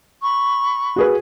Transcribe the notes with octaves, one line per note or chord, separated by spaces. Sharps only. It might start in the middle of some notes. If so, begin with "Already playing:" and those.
B5 C#6
F#4 G#4 B4